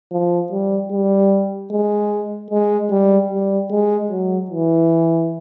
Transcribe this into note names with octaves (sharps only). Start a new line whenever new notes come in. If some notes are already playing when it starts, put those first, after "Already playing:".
F3
G3
G3
G#3
G#3
G3
G3
G#3
F#3
E3